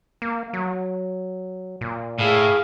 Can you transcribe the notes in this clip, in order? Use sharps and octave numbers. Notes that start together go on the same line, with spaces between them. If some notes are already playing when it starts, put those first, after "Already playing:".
A#3
F#3
A#2
A2 G#4 F5